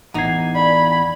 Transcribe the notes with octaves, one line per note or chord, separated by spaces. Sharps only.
A1 E2 D#4 A#5 G#6 C7
D5 B5